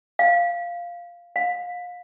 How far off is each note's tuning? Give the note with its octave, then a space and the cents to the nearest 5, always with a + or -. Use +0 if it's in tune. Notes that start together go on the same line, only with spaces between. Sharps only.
F5 -5
F5 +35